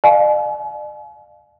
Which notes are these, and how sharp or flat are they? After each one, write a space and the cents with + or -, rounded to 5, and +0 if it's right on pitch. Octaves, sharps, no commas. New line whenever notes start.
D5 +45 F5 +0 G#5 +45